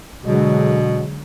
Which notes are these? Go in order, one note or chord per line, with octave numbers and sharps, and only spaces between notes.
B2 D3 F#3 G#3